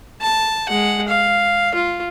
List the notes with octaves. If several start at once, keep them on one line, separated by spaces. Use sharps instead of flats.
A5
G#3 F#5
F5
F4